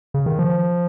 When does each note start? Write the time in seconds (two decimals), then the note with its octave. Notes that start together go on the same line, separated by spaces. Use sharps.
0.14 C#3
0.26 D#3
0.39 F3